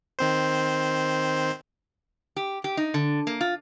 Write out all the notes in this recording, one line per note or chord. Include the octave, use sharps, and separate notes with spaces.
D#3 C4 C5
G4
G4
D#4
D3
A#3
F4